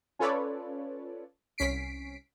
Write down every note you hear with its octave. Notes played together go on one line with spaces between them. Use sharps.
C#4 F4 A4 B4 C#5 D5
C2 C#4 B6 C7 D7